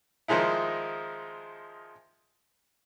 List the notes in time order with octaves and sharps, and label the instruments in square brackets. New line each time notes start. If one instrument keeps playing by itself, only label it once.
[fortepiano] D#3 F3 G#3 D#4 E4